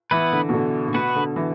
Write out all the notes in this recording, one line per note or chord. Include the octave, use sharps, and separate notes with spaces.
E3 B3 E4 B4
D3
B2
D3
D3
B2 B3 F#4 B4
D3
E3